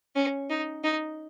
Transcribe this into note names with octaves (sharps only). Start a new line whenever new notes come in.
C#4
D#4
D#4